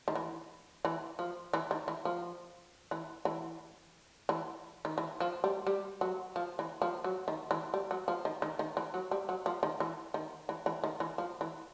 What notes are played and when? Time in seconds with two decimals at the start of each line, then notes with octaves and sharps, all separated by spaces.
0.08 D#3
0.15 E3
0.85 E3
1.19 F3
1.53 E3
1.71 D#3
1.88 E3
2.05 F3
2.91 E3
3.25 E3
4.29 E3
4.85 D#3
4.98 E3
5.20 F3
5.44 G3
5.67 G3
6.01 F#3
6.36 F3
6.59 E3
6.82 F3
7.04 F#3
7.28 D#3
7.51 E3
7.74 G3
7.91 F#3
8.08 F3
8.25 D#3
8.42 D#3
8.59 D#3
8.77 E3
8.94 F#3
9.11 G3
9.29 F#3
9.46 F3
9.63 D#3
9.80 E3
10.14 D#3
10.49 E3
10.66 E3
10.84 D#3
11.00 E3
11.18 F3
11.41 E3